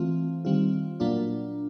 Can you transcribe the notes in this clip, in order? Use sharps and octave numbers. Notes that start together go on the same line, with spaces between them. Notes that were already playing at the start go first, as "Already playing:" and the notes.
Already playing: E3 A3 C4 F4
D#3 G3 C4 F4
A#2 F#3 A#3 D4 F4